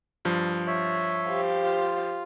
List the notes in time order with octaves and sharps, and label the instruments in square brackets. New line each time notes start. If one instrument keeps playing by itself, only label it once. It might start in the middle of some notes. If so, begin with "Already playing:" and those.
[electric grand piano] G2 F3
[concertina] C#5 E5
[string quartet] G4 C5 F5
[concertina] F4